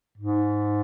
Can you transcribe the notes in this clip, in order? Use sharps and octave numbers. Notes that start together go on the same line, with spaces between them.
G#2